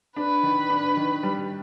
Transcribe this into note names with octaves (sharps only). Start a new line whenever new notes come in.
D4 B4
D#3
D4
D#3
G3